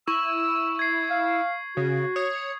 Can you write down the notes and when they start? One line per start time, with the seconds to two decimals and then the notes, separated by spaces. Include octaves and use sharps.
0.08 E4 C#6 E6 F#7
0.79 G#6 C7
1.10 F5
1.77 C#3 F#4
2.16 C#5 D#6 G#6